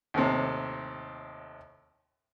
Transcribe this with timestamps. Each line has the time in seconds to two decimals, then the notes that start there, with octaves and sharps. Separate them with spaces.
0.14 D#2 A2 C3